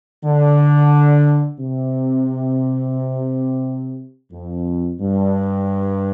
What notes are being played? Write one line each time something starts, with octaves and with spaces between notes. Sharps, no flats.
D3
C3
F2
G2